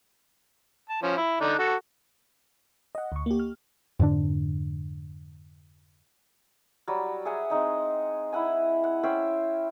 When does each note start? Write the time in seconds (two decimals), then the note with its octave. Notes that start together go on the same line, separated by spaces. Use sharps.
0.89 A5
1.02 F3 C#4
1.17 E4
1.41 D3 D4 D#4
1.59 F#4 A4
2.95 D#5 F#5
3.12 D2 C#6
3.26 A#3 G4
3.39 F6
4.00 F2 G#2 D3 D4
6.87 F#3 G3
7.25 G#4 E5 F#5 G#5
7.50 G#3 C4 D#4 D#5
8.32 E4 E5 F#5 G#5
8.84 F#5
9.03 C#4 C5 E5 G5